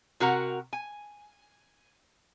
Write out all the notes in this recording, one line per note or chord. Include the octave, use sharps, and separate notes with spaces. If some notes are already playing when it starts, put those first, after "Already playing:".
C3 F#4 A#4 F#5 A#5
G#5